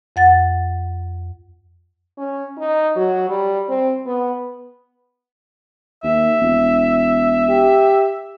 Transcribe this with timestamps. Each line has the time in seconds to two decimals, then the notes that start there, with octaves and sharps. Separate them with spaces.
0.16 F2 F#5 A6
2.18 C#4
2.58 D#4
2.96 F#3
3.29 G3
3.69 C4
4.06 B3
6.04 D#2 E5
6.40 E1
7.50 G4